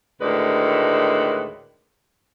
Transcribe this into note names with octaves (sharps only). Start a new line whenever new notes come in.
D2 A2 D#3 G#3 B4 D5